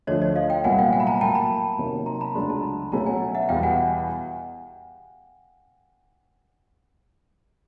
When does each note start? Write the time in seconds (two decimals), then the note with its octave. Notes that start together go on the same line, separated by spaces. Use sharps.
0.07 D2 D3 F3 C#5 D#5
0.22 C#5 D#5
0.36 D#5 F5
0.50 F5 G5
0.64 C2 A#2 F#3 B3 F#5 G#5
0.79 F5 G5
0.93 F#5 G#5
1.00 B5
1.07 G#5 A#5
1.21 A2 F#3 A#3 G5 A5
1.35 A5 B5
1.78 C3 D#3 F#3 A#3 C#4
2.06 A#5 C6
2.21 A5 B5
2.35 C#2 C#3 F#3 A3 D4 A#5 C6
2.49 A5 B5
2.82 B5
2.92 B2 F#3 A3 C#4 G#5 A#5
3.06 F#5 G#5
3.35 E5 F#5
3.49 E2 B2 G3 B3 F5 G5
3.63 F#5 G#5